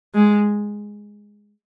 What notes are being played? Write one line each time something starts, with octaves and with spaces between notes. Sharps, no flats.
G#3